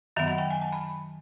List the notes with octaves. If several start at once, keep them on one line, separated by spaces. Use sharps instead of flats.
F#2 D#3 F#3 B3 E5
F#5
G5
G#5
A5
B5